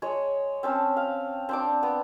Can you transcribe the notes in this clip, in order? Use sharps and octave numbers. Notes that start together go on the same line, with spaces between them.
G#3 C#5
C4 C#4 A5
F5
C4 D4 D6
B3